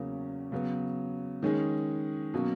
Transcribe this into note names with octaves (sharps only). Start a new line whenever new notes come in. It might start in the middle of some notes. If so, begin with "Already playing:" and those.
Already playing: E2 C#3 F#3 A#3 C#4
C#3 F#3 B3
D#3 G#3 C#4 G#4
B2 F#3 A#3 C#4